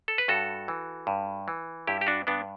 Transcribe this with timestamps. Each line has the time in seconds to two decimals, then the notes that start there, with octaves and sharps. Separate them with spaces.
0.08 A4
0.18 B4
0.28 G2 F#4 A4
0.68 E3
1.07 G2
1.48 E3
1.87 G2 E4 G4
2.01 G4
2.07 D4 F#4
2.27 G2 B3 D4